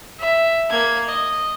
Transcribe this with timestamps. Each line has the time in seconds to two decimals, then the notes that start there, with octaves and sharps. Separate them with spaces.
0.20 E5
0.71 A#3 G#6
1.09 D#5